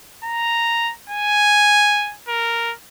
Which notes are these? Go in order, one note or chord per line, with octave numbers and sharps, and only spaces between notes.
A#5
G#5
A#4